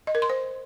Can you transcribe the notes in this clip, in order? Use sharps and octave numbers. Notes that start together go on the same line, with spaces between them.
D#5
A#4
C6
C5